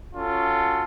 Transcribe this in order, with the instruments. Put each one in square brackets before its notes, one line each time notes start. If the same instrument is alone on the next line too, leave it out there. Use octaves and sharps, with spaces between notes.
[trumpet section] C#4 F4 F#4 A4